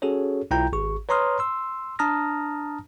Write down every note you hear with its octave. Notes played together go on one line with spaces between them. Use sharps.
C#4 F#4 G#4 A4 C#5
B1 E4 F4 G5 A#5 G6
G#1 G#4 C#6
B4 C#5 A#5 C6 D#6 F6
C6 E6
D4 A5 A#5 D#6 F6 A#6